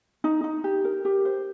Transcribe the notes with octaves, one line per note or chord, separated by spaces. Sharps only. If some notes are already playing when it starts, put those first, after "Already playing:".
D#4
D#4
G4
A#4
G4
C5